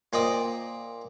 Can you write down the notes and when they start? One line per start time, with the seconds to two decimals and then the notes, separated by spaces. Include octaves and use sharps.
0.13 A#2 C5 D5 D#5 G5